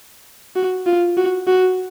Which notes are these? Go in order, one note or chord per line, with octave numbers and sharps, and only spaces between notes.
F#4
F4
F#4
F#4